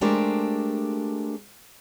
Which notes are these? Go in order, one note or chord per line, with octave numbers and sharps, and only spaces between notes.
G#3 A3 D4 G4 A#4 C5